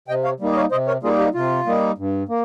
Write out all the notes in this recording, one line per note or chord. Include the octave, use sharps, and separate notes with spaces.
C3 D#5 G5
C#5 F5
G3 A#3 D#4
D#5
C#5 F5
C3 C5 D#5
A#4 C#5
G3 A#3 D#4 F4 G#4
G4
C3 F4
G3 A#3 D#4
G2
A#3